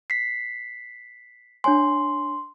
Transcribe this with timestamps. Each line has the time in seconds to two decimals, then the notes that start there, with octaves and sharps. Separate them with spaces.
0.10 B6 C7
1.64 D4 C#5 G#5 C6